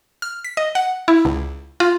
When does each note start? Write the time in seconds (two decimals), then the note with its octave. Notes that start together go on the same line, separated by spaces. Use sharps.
0.22 F6
0.44 B6
0.57 D#5
0.75 F#5
1.08 E4
1.25 C#2
1.80 F4